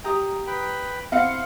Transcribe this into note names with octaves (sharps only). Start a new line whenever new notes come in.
G4 A#5 D#6
B4 G5 B5
C4 E4 F5 F#5 C6 C#7